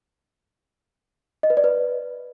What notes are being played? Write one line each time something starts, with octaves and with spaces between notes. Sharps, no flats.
D#5
B4
D5
B4